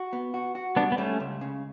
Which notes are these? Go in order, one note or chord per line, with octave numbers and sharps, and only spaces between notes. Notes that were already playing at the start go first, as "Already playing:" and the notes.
Already playing: F#4
B3
F#4
F#4
G3 B3 D4
B3
G3 A3 C#4
C#2
C#3